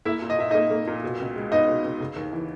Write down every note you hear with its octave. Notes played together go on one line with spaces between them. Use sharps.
A#3 E4 E5
A#2
D#5
A#2 E5
A#3 D#4 D#5
A#3
A#2
B2
C#2
G#3
B3 D#4 D#5
B2
C#2
C#3
D#2
E3